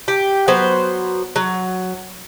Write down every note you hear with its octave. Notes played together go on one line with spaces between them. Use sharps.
G4
F#3 B3 C5
F#3